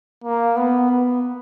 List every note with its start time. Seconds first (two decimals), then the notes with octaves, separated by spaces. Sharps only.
0.24 A#3
0.57 B3
0.91 B3